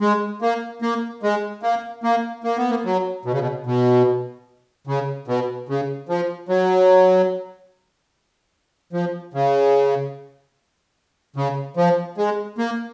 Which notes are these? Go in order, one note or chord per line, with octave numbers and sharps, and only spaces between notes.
G#3
A#3
A#3
G#3
A#3
A#3
A#3
B3
A#3
F#3
B2
C#3
B2
B2
C#3
B2
C#3
F3
F#3
F3
C#3
C#3
F3
G#3
A#3